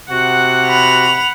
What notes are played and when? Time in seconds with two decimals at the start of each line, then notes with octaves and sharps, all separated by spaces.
0.10 C3 F#4 F#5
0.67 B5 F7